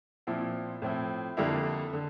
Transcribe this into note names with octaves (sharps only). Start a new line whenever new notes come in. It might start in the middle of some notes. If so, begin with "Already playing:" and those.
A#2 F3 C4 E4
A2 F3 C4 E4
F2 D3 G3 A#3 E4
D3